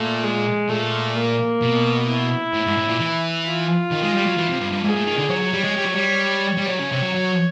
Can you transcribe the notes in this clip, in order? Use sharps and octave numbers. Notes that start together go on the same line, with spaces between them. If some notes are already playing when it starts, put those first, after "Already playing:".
Already playing: A#2 A3
G#3
A#2 A3
A#3
B2
E4
A2
G#2
A2
A#2
E3
F4
D#3
G#3
G3
F#3
E3
C3
G2
G2
G#2 G#4
A2
D#3
D3
F#3 C#5
F#3
G3
G#3
G3
F#3
G3
G3
F#3 C#5
C#3
C3
F#3
F#3